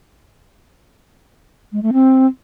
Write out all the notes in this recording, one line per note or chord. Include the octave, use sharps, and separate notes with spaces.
G#3
A3
C4